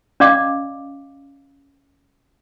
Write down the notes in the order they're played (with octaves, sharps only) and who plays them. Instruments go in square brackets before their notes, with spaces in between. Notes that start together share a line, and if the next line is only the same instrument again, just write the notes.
[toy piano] C#4 D5 D#5 F5 G5 D6